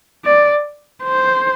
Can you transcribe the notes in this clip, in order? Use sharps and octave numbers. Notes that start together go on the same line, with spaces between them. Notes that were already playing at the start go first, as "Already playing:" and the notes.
D5
C5